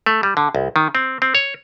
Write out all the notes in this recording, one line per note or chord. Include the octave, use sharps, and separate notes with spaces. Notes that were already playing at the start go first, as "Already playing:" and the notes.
A3
G3
D3
C2
D#3
C4
C4
C#5